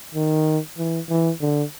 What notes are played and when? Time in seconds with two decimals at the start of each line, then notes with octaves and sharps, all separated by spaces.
0.14 D#3
0.78 E3
1.09 E3
1.41 D3